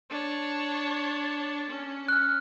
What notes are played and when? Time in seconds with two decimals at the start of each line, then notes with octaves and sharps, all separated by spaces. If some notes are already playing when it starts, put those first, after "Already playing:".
0.10 D4 C#5
1.70 C#4
2.09 F6 F#6